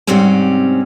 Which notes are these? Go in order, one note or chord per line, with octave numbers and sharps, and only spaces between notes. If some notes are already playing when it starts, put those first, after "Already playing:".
G#2 C3 F#3 G3 C4 C#4